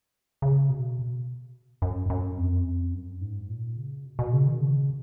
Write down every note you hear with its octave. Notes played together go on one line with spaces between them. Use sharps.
C#3
B2
F#2
F#2
F2
F#2
G#2
A#2
C#3
B2
B2
C#3
D#3
C#3